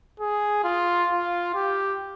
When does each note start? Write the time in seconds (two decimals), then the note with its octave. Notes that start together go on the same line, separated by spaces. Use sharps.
0.20 G#4
0.64 F4
1.10 F4
1.55 G4